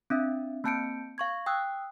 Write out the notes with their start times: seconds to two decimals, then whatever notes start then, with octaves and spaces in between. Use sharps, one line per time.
0.10 C4 D4 E5
0.64 A#3 C4 A5 G6 C#7 D7
1.18 F5 C#6 G#6
1.46 G5 D#6 E6 F#6